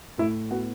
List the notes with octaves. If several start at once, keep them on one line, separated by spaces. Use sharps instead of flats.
A2 E4
B3 F#4